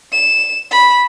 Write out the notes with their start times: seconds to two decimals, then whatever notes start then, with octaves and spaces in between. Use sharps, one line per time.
0.13 E7
0.71 B5